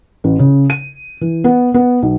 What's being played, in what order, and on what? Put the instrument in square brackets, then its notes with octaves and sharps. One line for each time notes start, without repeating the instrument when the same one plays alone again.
[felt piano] A1
C#3
D#7
E3
B3
B3
B1